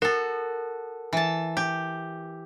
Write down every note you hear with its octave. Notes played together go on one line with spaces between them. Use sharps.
F#4 A4 A#4
E3 A5
G4